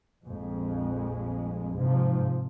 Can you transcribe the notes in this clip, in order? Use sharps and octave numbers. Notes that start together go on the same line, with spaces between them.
A#1 F2 G#3
G#2 C3 F3